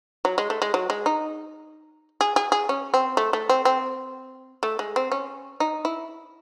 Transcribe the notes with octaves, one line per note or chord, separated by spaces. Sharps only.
F#3
G#3
A3
G#3
F#3
G#3
D#4
G#4
G#4
G#4
C#4
C4
A3
A3
C4
C4
A3
G#3
C4
C#4
D#4
E4